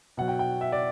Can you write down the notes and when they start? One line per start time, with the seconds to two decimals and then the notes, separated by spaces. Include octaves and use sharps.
0.17 B2 F#3 F#5
0.28 G5
0.39 G5
0.61 E5
0.72 D5